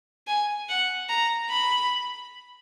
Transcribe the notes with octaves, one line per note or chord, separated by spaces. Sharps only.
G#5
F#5
A#5
B5